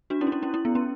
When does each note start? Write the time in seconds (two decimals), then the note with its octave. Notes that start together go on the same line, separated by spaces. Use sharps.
0.10 D4 F#4
0.21 C#4 E4
0.27 D4
0.32 C#4 E4
0.42 C#4 E4
0.54 C#4 E4
0.65 B3
0.75 C#4